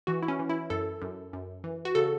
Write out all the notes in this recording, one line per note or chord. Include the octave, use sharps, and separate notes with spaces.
E3 F#4
E4
C#4
E3
E4
F#2 A4
F#2
F#2
E3
F#4
C#3 A4